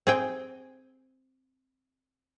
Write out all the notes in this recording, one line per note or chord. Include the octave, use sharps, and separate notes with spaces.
C4 G#4 G5